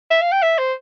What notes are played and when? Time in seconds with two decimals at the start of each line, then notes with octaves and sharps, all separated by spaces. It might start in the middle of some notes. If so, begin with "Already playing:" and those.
0.11 E5
0.21 F5
0.32 G5
0.42 E5
0.58 C5